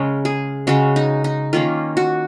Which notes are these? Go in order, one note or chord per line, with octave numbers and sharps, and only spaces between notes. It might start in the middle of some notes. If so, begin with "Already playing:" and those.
Already playing: C#3 G#3 C#4 A#4
G#4
C#3 G#3 C#4 F#4
D#4
D#4
D#3 A#3 C#4 F4
F#4